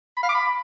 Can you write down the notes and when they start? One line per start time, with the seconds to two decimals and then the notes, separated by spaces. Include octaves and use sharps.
0.17 B5
0.23 F5
0.29 D6
0.35 B5